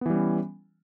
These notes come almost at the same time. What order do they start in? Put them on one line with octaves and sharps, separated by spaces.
B3 E3 G3 C#4